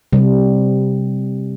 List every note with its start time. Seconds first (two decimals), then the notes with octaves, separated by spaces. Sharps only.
0.13 C3 G3